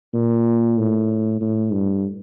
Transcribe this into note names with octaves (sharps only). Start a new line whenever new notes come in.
A#2
A2
A2
G2